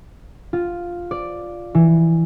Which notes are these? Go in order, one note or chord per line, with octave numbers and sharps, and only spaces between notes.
F4
D5
E3